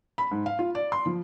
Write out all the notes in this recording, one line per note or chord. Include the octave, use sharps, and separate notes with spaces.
B5
G#2
F5
F4
D5
C6
F3